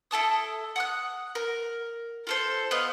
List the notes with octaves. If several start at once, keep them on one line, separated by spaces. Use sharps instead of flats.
E4 A4 A5 D#6
F#5 D#6 F#6
A#4
F4 A4 C5
B3 C5 D#5 F5